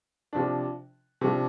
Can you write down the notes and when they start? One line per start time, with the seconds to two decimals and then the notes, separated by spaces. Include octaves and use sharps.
0.33 C3 F3 D4
1.21 C3 F3 D4